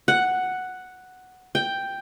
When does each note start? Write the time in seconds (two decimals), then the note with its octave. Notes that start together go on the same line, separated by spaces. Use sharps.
0.08 F#5
1.55 G5